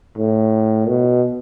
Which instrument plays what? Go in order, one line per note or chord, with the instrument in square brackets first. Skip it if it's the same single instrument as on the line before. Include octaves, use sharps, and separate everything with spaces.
[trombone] A2
B2